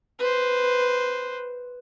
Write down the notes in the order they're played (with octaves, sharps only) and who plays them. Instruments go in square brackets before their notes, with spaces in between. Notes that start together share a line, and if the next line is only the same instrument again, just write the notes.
[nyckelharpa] B4 C5